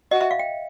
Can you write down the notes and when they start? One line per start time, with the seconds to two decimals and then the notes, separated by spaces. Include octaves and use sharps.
0.11 F#4 D#5
0.21 E5
0.31 F5
0.39 G5